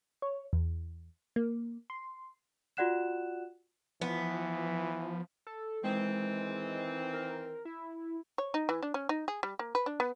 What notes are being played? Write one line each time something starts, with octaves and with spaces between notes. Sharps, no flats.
C#5
E2
A#3
C6
F4 F#4 D5 F#5 F#6 E7
E3 F3 B3
A4
D#3 E3 G#3 C4
A#4
E4
C#5
D#4
E3
D4
C#4
D#4
G#4
G3
A#3
B4
D4
B3